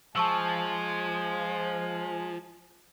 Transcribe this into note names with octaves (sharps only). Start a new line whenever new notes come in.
F3 G#3 G#5 A5 C#6 E6